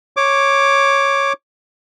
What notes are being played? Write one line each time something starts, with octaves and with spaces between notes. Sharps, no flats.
C#5 D6